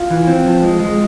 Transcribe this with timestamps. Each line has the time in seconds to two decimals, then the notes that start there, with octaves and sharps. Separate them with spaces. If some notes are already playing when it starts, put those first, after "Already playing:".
Already playing: F4
0.11 E3
0.27 C4
0.46 F3
0.63 G#3
0.80 G#3